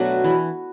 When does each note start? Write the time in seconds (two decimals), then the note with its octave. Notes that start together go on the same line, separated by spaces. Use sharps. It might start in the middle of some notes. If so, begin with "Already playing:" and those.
Already playing: B2 F#3 A3 D4 F#4
0.24 E3 E4